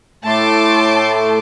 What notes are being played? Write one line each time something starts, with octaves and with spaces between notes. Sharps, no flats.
A2 A3 A5 C6 D6